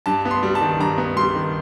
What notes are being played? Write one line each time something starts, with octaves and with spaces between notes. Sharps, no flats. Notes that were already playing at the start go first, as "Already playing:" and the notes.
G2 A5
B3
C6
G3
A5
D#3
G2 A#5
B3
G3 C6
D#3